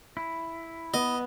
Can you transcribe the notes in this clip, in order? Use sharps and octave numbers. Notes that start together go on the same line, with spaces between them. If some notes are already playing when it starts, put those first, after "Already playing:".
E4
B3 D#5